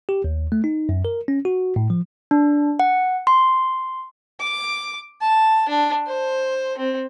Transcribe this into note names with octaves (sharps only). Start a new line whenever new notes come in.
G4
D#2
A3
D#4
F#2
A#4
C#4
F#4
A2
F3
D4
F#5
C6
D6
A5
D4
C5
C4